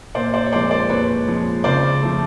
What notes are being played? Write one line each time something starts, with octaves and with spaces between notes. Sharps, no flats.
A#2 C5 D5
C5 D5
C#5
F3 G#3 C5 D5
C5 D5
A#2 B4 C#5
F3 G#3
C#3 C5 D5
F3 A3